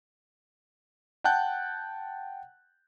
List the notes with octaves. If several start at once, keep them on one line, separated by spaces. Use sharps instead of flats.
F#5 G5 A5 F#6 G6